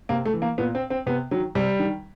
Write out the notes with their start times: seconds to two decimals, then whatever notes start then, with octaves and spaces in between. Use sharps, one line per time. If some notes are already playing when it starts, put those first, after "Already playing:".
0.09 C3 A#3
0.25 A3
0.34 E3
0.42 A#3
0.58 A#2 B3
0.75 C4
0.90 C4
1.06 C3 B3
1.31 D#3 F#3
1.55 C3 G3
1.80 D#3